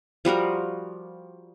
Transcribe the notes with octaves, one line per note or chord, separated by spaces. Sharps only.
F3 G3 F#4 A#4